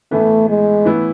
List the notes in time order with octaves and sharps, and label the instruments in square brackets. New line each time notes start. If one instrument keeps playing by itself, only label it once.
[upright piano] A2 E3 B3 [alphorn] A3
[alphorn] G#3
[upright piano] A2 E3 B3 E4